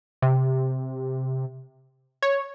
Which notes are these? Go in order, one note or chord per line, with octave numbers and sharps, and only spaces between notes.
C3
C#5